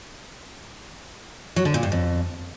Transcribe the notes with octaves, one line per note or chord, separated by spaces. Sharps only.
F#3
D3
A#2
G2
F2